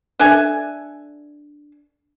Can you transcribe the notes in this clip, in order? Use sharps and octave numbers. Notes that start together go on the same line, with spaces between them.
D4 A4 E5 G#5